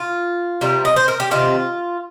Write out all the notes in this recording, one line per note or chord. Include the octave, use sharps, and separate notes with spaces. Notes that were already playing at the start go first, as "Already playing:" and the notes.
Already playing: F4
C3 G3 A#3
D#5
C5
A#4
G4
C3 D#3 C4 F4